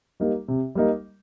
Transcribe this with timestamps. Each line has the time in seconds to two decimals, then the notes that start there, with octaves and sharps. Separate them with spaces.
0.20 G3 A#3 D#4
0.48 C3
0.75 G3 A#3 D#4